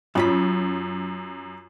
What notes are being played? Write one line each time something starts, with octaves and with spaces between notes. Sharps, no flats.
F#2 F#3 C#4 F4 B5